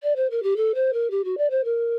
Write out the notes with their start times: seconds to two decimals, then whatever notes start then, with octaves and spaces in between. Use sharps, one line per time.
0.03 D5
0.16 C5
0.30 A#4
0.43 G4
0.56 A4
0.75 C5
0.93 A#4
1.10 G4
1.24 F#4
1.38 D5
1.50 C5
1.64 A#4